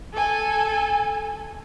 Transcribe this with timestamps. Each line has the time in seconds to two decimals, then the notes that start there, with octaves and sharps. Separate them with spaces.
0.14 A4 G#5